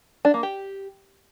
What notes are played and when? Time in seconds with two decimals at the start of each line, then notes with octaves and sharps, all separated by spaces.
0.25 D4
0.34 A#3
0.43 G4